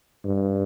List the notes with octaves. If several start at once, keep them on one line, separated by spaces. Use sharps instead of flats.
G2